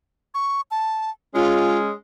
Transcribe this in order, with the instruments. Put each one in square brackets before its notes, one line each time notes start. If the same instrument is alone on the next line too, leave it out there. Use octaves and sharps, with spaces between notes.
[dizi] C#6
A5
[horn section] G#3 C#4 [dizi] F4